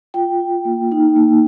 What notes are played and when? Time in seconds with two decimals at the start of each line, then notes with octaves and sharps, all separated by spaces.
0.14 F4 G5
0.40 F4
0.65 A#3
0.91 D#4
1.16 A#3